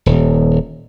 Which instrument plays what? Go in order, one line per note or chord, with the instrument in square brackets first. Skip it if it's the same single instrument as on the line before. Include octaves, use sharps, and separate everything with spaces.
[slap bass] D#1